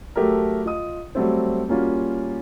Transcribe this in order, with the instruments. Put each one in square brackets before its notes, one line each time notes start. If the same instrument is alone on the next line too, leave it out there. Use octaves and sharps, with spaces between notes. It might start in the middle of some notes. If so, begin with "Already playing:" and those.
[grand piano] F#3 A3 G4 A4 A#4
F4 D#5 D#6
F#3 G3 A3 C4
G3 A#3 C#4 F4 F#4